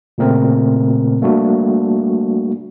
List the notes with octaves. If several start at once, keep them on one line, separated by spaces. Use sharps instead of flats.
A#2 C#3 A3 C4 A#4
G3 A3 A#3 D4 F#4